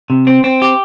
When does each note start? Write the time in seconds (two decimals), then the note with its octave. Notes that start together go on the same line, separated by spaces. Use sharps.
0.10 C3
0.27 C4
0.44 C4
0.62 G4